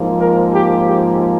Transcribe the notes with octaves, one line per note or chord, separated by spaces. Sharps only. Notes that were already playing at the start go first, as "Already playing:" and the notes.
Already playing: G#2 F3 A#3
A#4
G4
G4